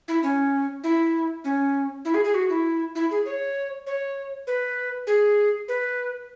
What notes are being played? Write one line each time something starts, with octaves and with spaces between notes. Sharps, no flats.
E4
C#4
E4
C#4
E4
G#4
G#4
F#4
E4
E4
G#4
C#5
C#5
B4
G#4
B4